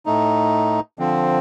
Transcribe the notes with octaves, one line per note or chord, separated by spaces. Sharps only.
A2 A3 D#4
D3 F3 C4